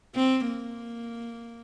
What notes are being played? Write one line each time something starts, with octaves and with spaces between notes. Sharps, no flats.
C4
A#3